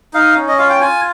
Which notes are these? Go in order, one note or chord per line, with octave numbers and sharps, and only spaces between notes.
D#4 F5
C#4
D#5
F4 F5
G5
F4 G#5